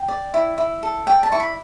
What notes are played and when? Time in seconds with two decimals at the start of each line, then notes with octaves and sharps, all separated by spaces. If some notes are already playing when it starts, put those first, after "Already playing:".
Already playing: G5
0.08 D5
0.34 E4
0.58 E4
0.83 A4
1.07 D5 G5
1.23 A5
1.32 E4 C#6
1.40 B5